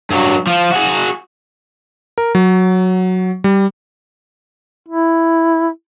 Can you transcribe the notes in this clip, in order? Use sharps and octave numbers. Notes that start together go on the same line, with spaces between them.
G2 F#3
F3
F#4 G#4
A#4
F#3
G3
E4